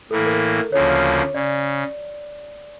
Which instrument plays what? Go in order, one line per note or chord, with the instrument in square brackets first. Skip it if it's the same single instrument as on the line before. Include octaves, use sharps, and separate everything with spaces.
[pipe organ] A2 E3 A#3 [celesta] A4
[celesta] A#4
[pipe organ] D2 C#3 F3 A#3 [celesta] C#5
[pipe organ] C#3 [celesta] D5